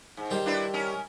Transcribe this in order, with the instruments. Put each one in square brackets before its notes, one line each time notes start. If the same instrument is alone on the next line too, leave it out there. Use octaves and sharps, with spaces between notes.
[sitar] G#2
[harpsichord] D#3 G3 C5
[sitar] D4 E4 B4
C#4 D#4 A#4